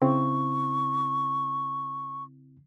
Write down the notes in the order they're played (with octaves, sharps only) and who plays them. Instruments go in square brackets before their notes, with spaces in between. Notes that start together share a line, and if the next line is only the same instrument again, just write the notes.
[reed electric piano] C#3 C4 E4 [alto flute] C#6